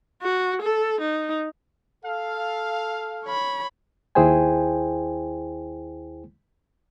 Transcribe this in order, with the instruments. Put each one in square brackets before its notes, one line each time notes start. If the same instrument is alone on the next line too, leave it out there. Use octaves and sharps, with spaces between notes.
[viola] F#4
A4
D#4
[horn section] A4 F5
[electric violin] C#5 B5
[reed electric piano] D#2 E4 G#4 C5 G5 G#5